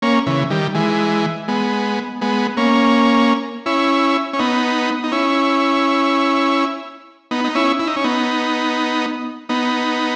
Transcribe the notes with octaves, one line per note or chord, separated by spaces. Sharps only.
A#3 C#4
C#3 E3
D#3 G3
E3 G#3
G#3 B3
G#3 B3
A#3 C#4
C#4 E4
C#4
B3 D#4
D#4
C#4 E4
B3 D#4
D#4
C#4 E4
E4
D#4
C#4
B3 D#4
B3 D#4